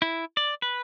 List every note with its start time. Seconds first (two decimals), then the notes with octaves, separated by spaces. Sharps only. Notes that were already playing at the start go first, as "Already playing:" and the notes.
0.02 E4
0.37 D5
0.62 B4